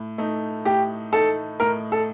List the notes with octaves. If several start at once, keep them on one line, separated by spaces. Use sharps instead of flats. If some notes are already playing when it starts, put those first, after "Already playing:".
Already playing: A2
A3 D#4
A2 G4
A3 D#4 A4
A2 A#4
A4